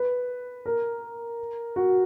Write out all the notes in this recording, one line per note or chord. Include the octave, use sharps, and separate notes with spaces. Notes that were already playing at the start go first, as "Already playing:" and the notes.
Already playing: B4
A#4
F#4